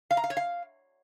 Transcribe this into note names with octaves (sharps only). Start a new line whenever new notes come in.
F5
A#5
F5
C#5
F5